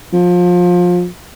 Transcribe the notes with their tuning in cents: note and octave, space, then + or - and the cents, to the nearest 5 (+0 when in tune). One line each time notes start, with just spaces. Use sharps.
F3 +25